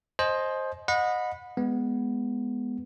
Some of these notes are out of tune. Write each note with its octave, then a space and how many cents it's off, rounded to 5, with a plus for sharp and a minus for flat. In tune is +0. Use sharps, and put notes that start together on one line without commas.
C5 +15 D#5 +0 G#5 +45
D#5 -10 F#5 -30 B5 +0
G#3 +0 B3 +0